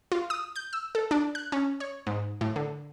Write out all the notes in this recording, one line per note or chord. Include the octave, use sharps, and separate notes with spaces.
F4
D#6
G6
E6
A4
D4
F#6
C#4
C#5
G#2
A2
D3